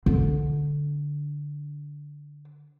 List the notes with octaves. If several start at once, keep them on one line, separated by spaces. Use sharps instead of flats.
D3 D4